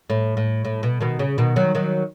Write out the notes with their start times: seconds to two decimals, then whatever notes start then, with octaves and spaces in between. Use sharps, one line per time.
0.10 A2
0.37 A2
0.65 A2
0.83 B2
1.01 B2 D#3
1.19 C#3
1.38 B2 D#3
1.56 D#3 F#3
1.75 D#3 F#3